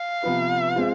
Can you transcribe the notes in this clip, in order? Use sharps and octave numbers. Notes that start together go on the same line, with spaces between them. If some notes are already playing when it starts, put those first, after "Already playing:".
Already playing: F5
C3 F3 B3 F4 B4
G#3 C4 F4